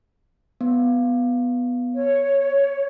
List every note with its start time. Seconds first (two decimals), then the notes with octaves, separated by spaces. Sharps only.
0.61 B3
1.94 C#5